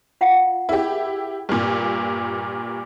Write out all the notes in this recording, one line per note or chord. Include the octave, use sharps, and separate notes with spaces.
F4 F5 F#5
E4 G4 G#4 A#4
G2 A#2